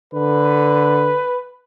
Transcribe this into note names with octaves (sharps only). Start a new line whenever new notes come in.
D3 B4